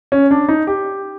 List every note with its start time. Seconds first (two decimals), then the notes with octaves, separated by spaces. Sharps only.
0.12 C#4
0.31 D4
0.49 D#4
0.67 G4